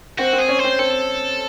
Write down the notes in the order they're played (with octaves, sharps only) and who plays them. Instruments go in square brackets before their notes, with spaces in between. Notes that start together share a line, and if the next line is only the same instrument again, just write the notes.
[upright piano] C4 [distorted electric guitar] F#4
[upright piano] C4
[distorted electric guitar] G#4
[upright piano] C#4
[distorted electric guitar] C5
[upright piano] C4
[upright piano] C4 [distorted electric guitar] A4